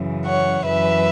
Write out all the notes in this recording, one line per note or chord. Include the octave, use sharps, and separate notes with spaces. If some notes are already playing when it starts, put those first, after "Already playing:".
Already playing: F#2 C#3 E3
C#5 F#5
F#2 E3 B4 E5